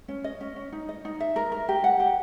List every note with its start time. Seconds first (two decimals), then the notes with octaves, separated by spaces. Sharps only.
0.08 C#4
0.24 D#5
0.41 C#4
0.56 C#4
0.72 D#4
0.89 D#5
1.05 D#4
1.20 E5
1.36 A#4
1.52 A#4
1.69 G4
1.84 F#5
2.00 G4